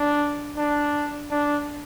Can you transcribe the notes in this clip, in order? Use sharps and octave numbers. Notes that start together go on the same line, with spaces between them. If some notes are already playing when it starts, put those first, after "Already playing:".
Already playing: D4
D4
D4